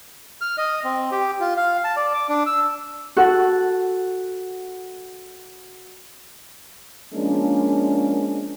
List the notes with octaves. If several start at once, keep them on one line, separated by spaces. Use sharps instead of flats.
F6
D#5
C4
G4
F4
F5
A5
D5
D6
D4
E6
F#4 A4 F#5
F3 G#3 A#3 C#4 D4